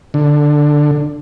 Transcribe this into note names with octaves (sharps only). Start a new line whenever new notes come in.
D3